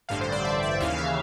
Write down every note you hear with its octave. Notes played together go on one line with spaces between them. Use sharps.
A1 G2 D3 F5
C5
D5
E5
E5
D#2 C#3 E3 F5
E5